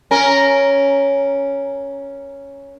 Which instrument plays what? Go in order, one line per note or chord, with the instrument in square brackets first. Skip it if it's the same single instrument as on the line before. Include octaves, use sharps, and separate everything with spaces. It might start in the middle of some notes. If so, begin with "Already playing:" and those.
[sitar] C#4 A#4